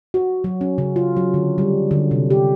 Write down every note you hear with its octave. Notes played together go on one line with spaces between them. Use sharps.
F#4
F#3
C#4
C#3
F4
F#3
D3
G3
D3
C3
G4